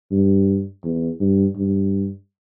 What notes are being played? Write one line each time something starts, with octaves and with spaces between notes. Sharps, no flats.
G2
E2
G2
G2